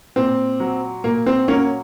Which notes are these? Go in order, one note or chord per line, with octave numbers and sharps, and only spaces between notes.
A#2 C4
F#3
A#2 A#3
C4
F#3 A#3 C#4